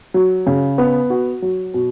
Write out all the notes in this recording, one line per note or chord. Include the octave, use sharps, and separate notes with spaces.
F#3
C#3
B3
F#4
F#3
B2